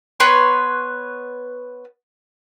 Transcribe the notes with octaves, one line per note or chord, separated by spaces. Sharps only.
B3 B4 C#5 C6